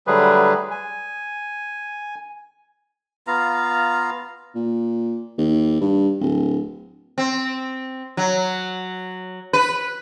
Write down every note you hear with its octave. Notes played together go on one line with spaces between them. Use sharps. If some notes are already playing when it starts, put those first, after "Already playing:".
D3 F#3 G3 A3 G#4 B4
G#5
B3 F4 F5 A#5
A#2
D#2
G2
D1
C4
F#3
B4